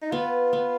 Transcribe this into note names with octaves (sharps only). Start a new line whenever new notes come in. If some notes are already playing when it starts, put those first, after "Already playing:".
D#4
B3 F4
B3